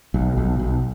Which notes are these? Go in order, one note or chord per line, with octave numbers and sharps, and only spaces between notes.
B1
B1
B1